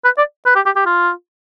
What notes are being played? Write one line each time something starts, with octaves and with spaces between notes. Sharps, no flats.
B4
D5
B4
G4
G4
G4
F4